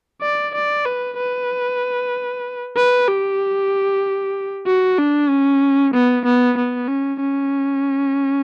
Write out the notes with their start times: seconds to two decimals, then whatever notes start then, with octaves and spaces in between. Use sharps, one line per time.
0.22 D5
0.55 D5
0.86 B4
1.17 B4
2.76 B4
3.08 G4
4.67 F#4
4.99 D4
5.30 C#4
5.94 B3
6.25 B3
6.57 B3
6.88 C#4
7.21 C#4